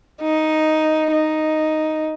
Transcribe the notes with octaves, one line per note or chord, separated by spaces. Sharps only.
D#4
D#4